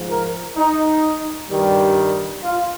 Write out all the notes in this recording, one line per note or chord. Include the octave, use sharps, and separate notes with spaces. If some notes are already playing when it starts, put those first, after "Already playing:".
Already playing: G#2 F3
A#4
D#4
G2 D#3 G3
F4